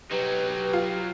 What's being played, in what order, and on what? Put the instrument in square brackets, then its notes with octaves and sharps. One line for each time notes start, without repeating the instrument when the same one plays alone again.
[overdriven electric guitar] F#3 D#4 [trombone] G4 [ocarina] B4
[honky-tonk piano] F4